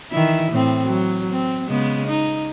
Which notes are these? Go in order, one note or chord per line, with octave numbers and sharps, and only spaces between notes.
D#3 E3 E4
A2 C4
F#3
C4
C#3 G#3 B3
D#4